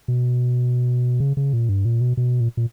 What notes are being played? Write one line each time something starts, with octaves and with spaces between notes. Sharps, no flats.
B2
C#3
C#3
A#2
G2
A#2
B2
B2
A#2
A#2